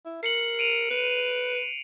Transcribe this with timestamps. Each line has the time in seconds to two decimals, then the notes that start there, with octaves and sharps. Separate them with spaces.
0.05 E4
0.23 A#4 C7 C#7 F#7
0.59 D7 D#7 F7
0.90 B4